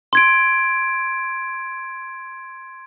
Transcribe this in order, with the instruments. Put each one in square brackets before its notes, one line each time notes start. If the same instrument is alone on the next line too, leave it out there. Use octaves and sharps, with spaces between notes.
[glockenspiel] C6 G#6 D7